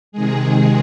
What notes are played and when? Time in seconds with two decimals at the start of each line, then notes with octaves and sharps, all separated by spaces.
0.12 C3 D#3 G#3 G#4